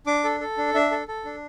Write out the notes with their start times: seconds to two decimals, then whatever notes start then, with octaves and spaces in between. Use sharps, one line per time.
0.07 D4 D6
0.24 A4
0.40 A4
0.58 D4
0.74 D4 E5
0.91 A4
1.08 A4
1.25 D4